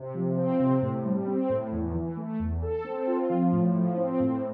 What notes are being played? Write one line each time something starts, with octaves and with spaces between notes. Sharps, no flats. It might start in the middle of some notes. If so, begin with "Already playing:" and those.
Already playing: C3
F3
C4
C3
A2
G3
C4
A2
E2
E3
A3
E2
A4
C4
F4
F3
A2
F3
C4
A2